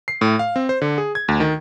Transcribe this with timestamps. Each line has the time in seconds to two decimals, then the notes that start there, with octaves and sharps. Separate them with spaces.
0.08 C7
0.21 A2
0.39 F5
0.56 C4
0.69 C5
0.82 D3
0.98 G#4
1.15 G#6
1.28 D2
1.40 D#3